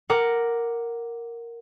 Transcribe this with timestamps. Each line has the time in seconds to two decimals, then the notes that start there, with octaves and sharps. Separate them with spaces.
0.10 A#4 F#5 D6